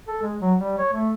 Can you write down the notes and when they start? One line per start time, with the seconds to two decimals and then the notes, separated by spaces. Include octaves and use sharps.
0.07 A4
0.22 G#3
0.41 F#3
0.59 G3
0.78 C#5
0.93 A3